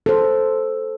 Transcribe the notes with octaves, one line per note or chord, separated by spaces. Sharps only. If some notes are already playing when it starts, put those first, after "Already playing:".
A4 C5